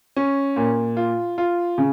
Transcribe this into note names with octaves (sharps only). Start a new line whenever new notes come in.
C#4
A#2
F4
F4
C#3